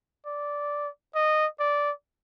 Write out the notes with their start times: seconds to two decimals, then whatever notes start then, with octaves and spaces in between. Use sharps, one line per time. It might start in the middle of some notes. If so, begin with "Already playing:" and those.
0.26 D5
1.15 D#5
1.60 D5